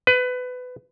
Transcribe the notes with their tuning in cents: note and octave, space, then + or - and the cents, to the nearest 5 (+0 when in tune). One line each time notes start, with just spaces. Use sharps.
B4 +20